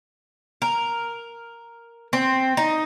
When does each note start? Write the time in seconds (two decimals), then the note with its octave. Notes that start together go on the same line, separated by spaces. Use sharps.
0.62 A#4
2.13 C4
2.57 D#4